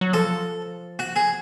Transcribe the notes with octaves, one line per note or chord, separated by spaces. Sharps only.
F#3
F3 A4
F#4
G#4